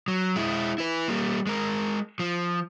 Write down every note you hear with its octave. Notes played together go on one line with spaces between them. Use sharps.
F#3
G#3 E4
E4 B4
G3 A#3
G#3 A#4
F3